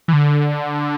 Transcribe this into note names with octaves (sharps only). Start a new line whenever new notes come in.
E3
D3